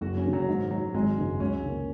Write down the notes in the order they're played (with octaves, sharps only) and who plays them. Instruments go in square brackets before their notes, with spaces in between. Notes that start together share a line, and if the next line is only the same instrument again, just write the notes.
[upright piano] F#1 [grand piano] F#4
[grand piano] C#4
[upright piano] F#2 C#3
[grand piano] F#3
[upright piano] G#2 [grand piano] D#3
[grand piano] F#3 [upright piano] G#3 F#4
[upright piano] G#1 [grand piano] G#3
[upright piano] F#2 C#3
[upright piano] C#2 [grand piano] C#4
[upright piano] C#3 A#3